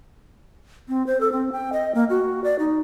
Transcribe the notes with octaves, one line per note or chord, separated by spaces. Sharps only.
C4
C5
A4
C4
G5
D#5
A#3
F#4
D5
D#4